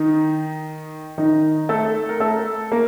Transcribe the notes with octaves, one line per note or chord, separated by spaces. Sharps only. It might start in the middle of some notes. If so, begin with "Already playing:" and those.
Already playing: D#3 D#4
D#3 D#4
A3 A4
A#4
A3 A4
A#3 A#4